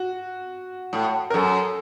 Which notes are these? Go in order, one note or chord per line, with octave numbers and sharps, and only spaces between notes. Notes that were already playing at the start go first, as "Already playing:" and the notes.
Already playing: F#4
A2
A#4
F#2 A4